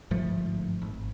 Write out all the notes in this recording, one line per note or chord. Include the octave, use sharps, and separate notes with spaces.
G1 G#2 F3 A3
G#1